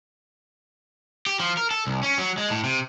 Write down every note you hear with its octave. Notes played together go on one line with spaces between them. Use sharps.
G4
F3
A#4
A4
C2
C#4
F#3
G#3
A2
C3